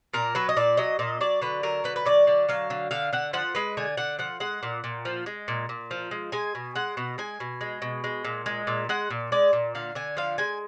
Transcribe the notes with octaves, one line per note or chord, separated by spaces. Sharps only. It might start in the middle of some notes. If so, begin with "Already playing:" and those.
A#2 A#4
F#3 B4
D#5
A#2 D5
F#3 D#5
A#2 D#5
F#3 D5
D3 B4
F#3 A#4
D3 B4
B4
F#3 D5
D3
F#3 F5
D3
D3 F5
D3 F#5
F3 F#5
G#3 B4
D3 G#5
D3 F#5
F3 F#5
G#3 F#5
A#2
A#2
F3
G#3
A#2
A#2
F3
G#3
G#3 G#5
B2
G#3 F#5
B2
G#3 G#5
B2
G#3
B2
G#3
A#2
G#3
A#2
G#3 F#5
A#2
G#3 D5
A#2
D3 F5
D3 G#5
F3 F5
G#3 G#5